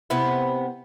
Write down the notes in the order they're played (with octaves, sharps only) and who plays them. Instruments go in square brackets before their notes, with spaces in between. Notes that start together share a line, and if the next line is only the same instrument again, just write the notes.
[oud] C3 B3 E4